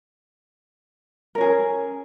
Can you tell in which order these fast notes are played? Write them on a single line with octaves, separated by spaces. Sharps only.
A#4 C#4 G#4